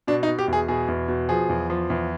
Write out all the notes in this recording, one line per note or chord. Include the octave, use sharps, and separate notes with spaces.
B2 D4
D#4
B2
G4
E2 G#4
B2 G#4
E2
B2
F3 G#4
E2
F3
E2